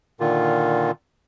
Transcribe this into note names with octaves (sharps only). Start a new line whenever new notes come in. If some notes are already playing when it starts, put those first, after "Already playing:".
A#2 D3 D#3 F4